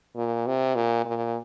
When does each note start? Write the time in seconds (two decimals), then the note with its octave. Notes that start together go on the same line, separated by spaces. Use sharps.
0.16 A#2
0.47 C3
0.75 A#2
1.05 A#2